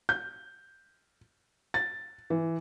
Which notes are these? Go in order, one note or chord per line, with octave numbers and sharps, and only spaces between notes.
G6
A6
E3